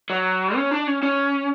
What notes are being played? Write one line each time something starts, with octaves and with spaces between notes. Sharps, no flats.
F#3
C#4
D4
C#4
C#4